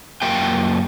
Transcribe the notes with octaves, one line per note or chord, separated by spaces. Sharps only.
F#2 A#3 F4 G4 G5